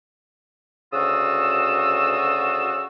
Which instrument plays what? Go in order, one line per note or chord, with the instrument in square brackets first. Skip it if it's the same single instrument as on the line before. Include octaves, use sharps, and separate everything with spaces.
[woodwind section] D2 C#3 F4 F#4 D#6 E6